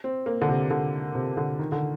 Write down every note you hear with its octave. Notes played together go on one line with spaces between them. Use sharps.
C4
A#3
D3
C3
D3
C3
D3
D#3
D3